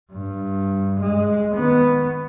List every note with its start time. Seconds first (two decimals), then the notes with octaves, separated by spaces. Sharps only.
0.11 G2
1.00 G#3
1.53 D#3 B3